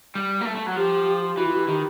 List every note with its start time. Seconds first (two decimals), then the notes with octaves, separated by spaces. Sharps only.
0.15 G3
0.41 A#3
0.45 A3
0.55 A3
0.66 F#3
0.76 F3 G4
1.37 E3 F#4
1.47 F4
1.53 F#4
1.58 G4
1.68 D#3 G4